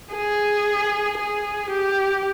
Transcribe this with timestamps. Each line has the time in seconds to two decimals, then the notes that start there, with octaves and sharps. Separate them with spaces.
0.13 G#4
1.18 G#4
1.70 G4